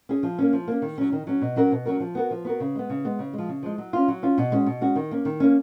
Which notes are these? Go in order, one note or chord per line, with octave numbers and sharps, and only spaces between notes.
C#4 G#4
F3
A#3 C#4
F3
A#3 C#4
D#3
F#3 C#4
D#3
F#3 C#4
B2
F#3 C#4 F#4 A#4
B2
F#3 C#4 F#4 A#4
F3
B3 F#4 A#4
F3
B3 F#4 A#4
C#3
G#3 B3
C#3
G#3 B3
C#3
G#3
F3
C#3
F3 G#3
F#3
C#4 F4
F#3
C#4 F4
B2
G#3 C#4 F#4
B2
G#3 C#4 F#4
D#3
A#3 C#4
D#3
A#3 C#4